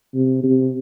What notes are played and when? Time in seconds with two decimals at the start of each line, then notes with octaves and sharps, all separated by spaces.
0.14 C3
0.44 C3